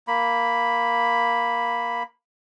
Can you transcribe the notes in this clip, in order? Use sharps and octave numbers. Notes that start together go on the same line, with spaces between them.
A#3 B5